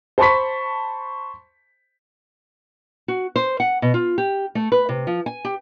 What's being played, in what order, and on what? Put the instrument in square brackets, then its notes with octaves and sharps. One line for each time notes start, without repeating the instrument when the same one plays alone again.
[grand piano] C5 A5 B5 C#6 B6
[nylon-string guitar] F#4
C5
F#5
B2
F4
G4
A3
B4
C3
F3
G#5
G4